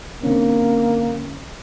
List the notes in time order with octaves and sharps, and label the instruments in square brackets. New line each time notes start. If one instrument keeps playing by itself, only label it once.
[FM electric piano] D3 C4 C#4 [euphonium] A#3